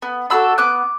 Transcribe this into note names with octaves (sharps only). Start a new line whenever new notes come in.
B3
D4 F#4 A4 B5 E6
B3 D6 F#6